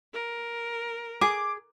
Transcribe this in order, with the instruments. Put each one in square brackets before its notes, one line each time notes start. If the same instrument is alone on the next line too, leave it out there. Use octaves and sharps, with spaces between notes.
[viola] A#4
[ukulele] G#4 [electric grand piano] D6